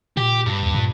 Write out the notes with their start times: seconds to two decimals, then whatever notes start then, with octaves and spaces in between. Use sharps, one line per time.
0.17 A#2 G4
0.46 G2
0.63 D#2
0.74 A#2